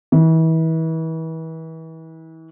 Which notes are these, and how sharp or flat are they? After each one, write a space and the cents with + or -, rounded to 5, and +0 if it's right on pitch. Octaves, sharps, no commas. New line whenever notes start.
E3 -35